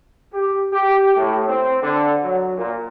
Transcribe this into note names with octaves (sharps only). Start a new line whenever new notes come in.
G4
G4
A2
C4
D3
F#3
A#2